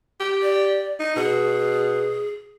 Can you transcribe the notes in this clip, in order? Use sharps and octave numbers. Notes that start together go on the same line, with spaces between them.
G4
D5
D#4
B2 G#4